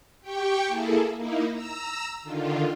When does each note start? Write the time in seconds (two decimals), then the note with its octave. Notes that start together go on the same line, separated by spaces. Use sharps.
0.21 G4 G5 C#6
0.68 A#3 E4 G#4 A4
1.16 A#3 D#4 E4
1.52 A#5 E6
2.23 D3 D#3 F4